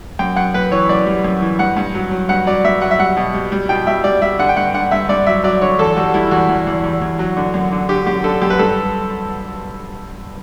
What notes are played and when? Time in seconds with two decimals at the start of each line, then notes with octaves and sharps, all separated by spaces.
0.19 F#2 G5
0.36 F#2 F#5
0.54 F#2 B4
0.72 E3 C#5
0.89 F#2 D5
1.06 G3
1.24 F#2
1.42 E3
1.59 G2 F#5
1.77 G2
1.95 F#3
2.11 F#3
2.29 G2 F#5
2.47 F#3 D5
2.64 G2 E5
2.81 F#3 F#5
2.91 E5
2.99 G3 F#5
3.17 B2
3.34 G3
3.52 G3
3.69 B2 G5
3.87 G3 E5
4.04 G3 D5
4.21 G3 E5
4.39 D3 F#5
4.49 G5
4.57 G2 F#5
4.74 D3 F#5
4.91 G2 E5
5.09 G2 D5
5.27 F#3 E5
5.44 F#3 D5
5.61 D3 C#5
5.79 E2 A4
5.96 G3 F#4
6.14 G3 E4
6.31 E2 F#4
6.49 E2
6.67 E2
6.84 E2
7.02 E2
7.19 F#3
7.37 D3
7.54 F#2
7.72 D3
7.89 D3 G4
8.07 F#2 G4
8.24 D3 A4
8.42 F#2 G4
8.50 B4
8.59 G2 A4